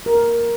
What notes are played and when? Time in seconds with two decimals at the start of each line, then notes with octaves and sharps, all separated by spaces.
0.06 A#4